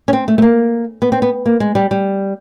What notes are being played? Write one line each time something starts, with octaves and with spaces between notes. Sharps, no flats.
C#4
C4
A3
A3
A#3
B3
C4
B3
A#3
G#3
G3
G3